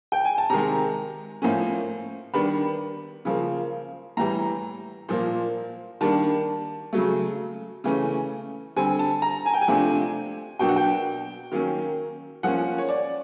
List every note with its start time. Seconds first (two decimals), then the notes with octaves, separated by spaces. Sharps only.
0.12 G5
0.25 G#5
0.38 A5
0.50 C3 D#3 G#3 A#5
1.42 A2 F3 A#3 C#4
2.34 D#3 G3 B3 D4 B5
3.25 C#3 F3 A#3
4.17 A2 E3 G3 A#5
5.09 A#2 F3 A#3
6.01 D#3 G3 A#3 D4 A5
6.93 C#3 F#3 A3
7.84 C#3 E3 A3 C#4
8.76 D3 G3 C4 G#5
8.99 A5
9.22 A#5
9.46 G#5
9.53 G5
9.62 G#5
9.68 C3 F3 A3 D4
10.59 B2 F#3 A#3 D4 G5
10.69 F#5
10.76 G5
11.52 D#3 F#3 A#3 C#4
12.43 F3 A#3 C#4 F#5
12.78 C#5
12.89 D5